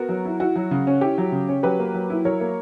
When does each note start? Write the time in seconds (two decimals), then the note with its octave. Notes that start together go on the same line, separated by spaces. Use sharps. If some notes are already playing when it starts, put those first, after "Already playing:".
Already playing: B3 F#4 A#4
0.09 F#3
0.25 E4
0.40 E4 F#4
0.56 F#3
0.71 C#3
0.87 C#4
1.01 E4 G4
1.18 F#3
1.32 C#3
1.49 C#4
1.63 F#3 G4 B4
1.79 A#3
1.94 F#3
2.10 E4
2.25 F#3 A#4 C#5
2.41 A#3